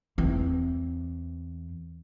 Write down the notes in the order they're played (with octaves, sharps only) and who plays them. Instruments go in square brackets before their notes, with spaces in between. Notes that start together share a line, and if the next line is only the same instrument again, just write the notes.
[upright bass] E2 C4